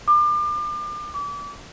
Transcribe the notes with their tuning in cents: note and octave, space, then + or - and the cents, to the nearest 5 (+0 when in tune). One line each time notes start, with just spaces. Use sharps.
D6 +35
D6 -35